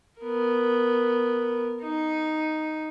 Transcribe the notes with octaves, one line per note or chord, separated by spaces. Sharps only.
B3 A#4
D#4